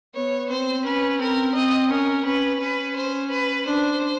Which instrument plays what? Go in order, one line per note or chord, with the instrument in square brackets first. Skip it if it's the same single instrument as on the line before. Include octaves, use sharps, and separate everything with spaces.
[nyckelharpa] B3 [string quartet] C#5
[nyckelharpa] C4 [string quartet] C5
[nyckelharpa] C#4 [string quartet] B4
[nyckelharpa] C4 [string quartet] A#4
[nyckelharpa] C4 [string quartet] D#5
[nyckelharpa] C#4 [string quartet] A#4
[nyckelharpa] C#4 [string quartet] B4
[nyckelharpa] C#4 [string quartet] B4
[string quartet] C5
B4
[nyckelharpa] D4 [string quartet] C5